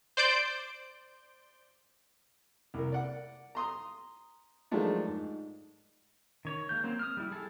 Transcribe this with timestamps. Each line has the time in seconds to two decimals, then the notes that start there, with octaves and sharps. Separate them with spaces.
0.17 C5 D5 G6 D7
2.74 C2 A#4
2.92 D5 F#5
3.55 A#5 C6 D#6
4.71 D#3 F3 F#3 G#3 A3 D4
5.07 G#2
6.45 D#3 C#5
6.69 G#3 A#3 G6
6.83 F#3 A#3 C4
6.99 D#6 F6
7.17 G3 E4
7.31 G3 G#4 A4